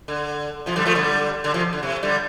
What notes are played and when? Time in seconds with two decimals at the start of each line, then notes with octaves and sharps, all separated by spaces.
0.08 D3
0.66 C3 F3
0.76 D3 G3
0.85 F3 A3
0.95 D3 G3
1.44 D3
1.54 C3 F3
1.73 D3
1.83 C3
2.03 D3 G3